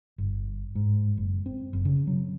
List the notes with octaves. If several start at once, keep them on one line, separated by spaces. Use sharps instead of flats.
G1
G#2
F#1
C4
F#1
C#3
F#3